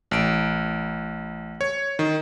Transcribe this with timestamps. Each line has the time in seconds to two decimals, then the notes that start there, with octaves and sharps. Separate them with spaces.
0.11 A1 D7
1.61 C#5
1.99 D#3